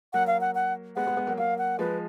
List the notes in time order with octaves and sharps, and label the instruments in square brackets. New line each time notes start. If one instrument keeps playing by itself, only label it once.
[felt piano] F#3 A#3 [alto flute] F#5
[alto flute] F5
F#5
F#5
[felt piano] G#3 B3 [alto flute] F#5
[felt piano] G#3 B3
G#3 B3
F#3 A#3
[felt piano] F#3 A#3 [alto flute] F5
[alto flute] F#5
[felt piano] F3 G#3 [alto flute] B4